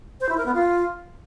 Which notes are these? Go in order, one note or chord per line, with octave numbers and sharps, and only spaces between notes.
C5
E4
A#4
B3
F4